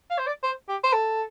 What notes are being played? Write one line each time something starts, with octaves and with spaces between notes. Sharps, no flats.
F5
C5
D5
C5
G4
C5
A4